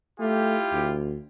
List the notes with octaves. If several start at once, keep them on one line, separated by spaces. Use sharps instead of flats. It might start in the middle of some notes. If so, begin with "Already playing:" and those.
A3 E4 F4 G4
D2